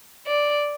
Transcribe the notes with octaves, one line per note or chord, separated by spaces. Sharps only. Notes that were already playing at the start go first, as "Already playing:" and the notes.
D5